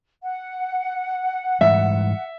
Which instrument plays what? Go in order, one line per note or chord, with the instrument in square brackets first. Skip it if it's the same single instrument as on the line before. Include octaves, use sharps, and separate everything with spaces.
[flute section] F#5
[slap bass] G#2 E3 G3 [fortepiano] E5